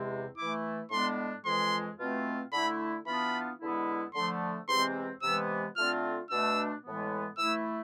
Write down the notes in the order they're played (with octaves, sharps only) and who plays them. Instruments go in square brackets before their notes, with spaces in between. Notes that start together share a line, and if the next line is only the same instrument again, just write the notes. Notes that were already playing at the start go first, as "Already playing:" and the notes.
Already playing: [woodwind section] E2 C3 G#3 C4
[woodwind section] E3 A3 E4 [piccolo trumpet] D6
[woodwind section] A2 G#3 B3 D4 [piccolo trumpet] C6
[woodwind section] F2 E3 G#3 [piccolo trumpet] C6
[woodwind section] B2 A3 C4 F4
[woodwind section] D3 A3 E4 [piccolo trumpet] B5
[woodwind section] E3 B3 D4 F4 [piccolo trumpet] B5
[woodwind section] E2 D3 G#3 B3 E4
[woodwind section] D3 F3 A3 [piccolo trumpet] C6
[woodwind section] E2 C3 E3 G#3 C4 [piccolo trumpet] C6
[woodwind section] C3 E3 G#3 B3 [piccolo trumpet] E6
[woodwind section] D3 A3 C4 F4 [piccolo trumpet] F6
[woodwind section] B2 A3 D4 [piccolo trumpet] E6
[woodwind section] A2 E3 G#3 B3
[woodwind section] E3 A3 E4 [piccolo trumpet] E6